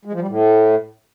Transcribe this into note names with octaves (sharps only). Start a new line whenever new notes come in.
G#3
F3
G3
A2